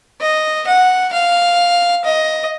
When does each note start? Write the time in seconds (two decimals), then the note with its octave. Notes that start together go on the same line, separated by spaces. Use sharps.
0.21 D#5
0.67 F#5
1.12 F5
2.04 D#5